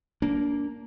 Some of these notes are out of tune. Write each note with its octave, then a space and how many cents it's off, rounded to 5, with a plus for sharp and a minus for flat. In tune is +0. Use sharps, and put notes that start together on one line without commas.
A#3 +0 D4 -30